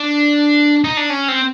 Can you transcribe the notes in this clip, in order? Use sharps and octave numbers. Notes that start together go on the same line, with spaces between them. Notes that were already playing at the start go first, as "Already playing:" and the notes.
Already playing: D4
D#4
D4
C#4
C4